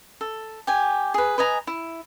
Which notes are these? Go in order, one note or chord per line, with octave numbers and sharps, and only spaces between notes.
A4
G4 G#5
G#4 B4
B4 D#5 G#5 A#5
E4